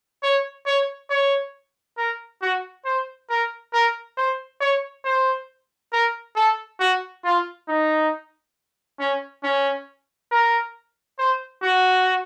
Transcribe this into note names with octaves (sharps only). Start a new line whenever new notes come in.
C#5
C#5
C#5
A#4
F#4
C5
A#4
A#4
C5
C#5
C5
A#4
A4
F#4
F4
D#4
C#4
C#4
A#4
C5
F#4